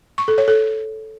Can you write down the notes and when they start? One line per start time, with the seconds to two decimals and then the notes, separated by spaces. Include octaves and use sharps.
0.18 C#6
0.28 A4
0.38 C#5
0.48 A4